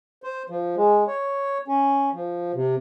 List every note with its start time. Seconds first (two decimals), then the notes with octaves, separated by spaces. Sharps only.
0.23 C5
0.49 F3
0.76 G#3
1.07 C#5
1.68 C#4
2.13 F3
2.54 C3